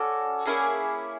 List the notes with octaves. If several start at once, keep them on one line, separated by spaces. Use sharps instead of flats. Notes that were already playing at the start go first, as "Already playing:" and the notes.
Already playing: C#4 F#4 A4 D5
A#3 C#4 E4 G#4